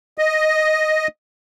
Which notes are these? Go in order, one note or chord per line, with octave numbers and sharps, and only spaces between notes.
D#5